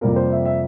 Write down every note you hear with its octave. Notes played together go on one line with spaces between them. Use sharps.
F2 C3 G3 A#3 A#4
C5
E5
E5